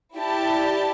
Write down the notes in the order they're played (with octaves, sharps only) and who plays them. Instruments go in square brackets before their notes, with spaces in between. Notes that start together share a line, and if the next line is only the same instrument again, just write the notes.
[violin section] E4 G4 D5 A5